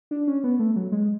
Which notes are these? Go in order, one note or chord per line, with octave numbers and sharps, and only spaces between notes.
D4
C#4
B3
A3
F#3
G#3